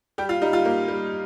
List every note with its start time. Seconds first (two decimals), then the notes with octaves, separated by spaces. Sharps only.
0.18 G3 G4
0.29 F4
0.42 G3 D#4
0.53 F4
0.65 A#3
0.88 G3